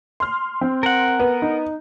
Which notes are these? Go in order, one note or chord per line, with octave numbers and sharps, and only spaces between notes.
C6 F6
C4
A#4 F#5
B3
D#4